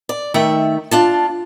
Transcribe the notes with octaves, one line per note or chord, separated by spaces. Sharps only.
D5
D#3 A3 E5
D4 F4 A5